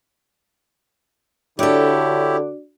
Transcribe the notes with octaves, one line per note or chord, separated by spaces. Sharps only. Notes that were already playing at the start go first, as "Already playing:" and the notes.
D3 D4 E4 F#4 G4 A4 C#5 D5